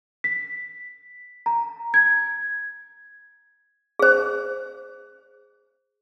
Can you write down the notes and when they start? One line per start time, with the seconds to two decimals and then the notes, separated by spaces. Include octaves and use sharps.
0.24 B6
1.46 A#5
1.94 G#6
3.99 G#4 C5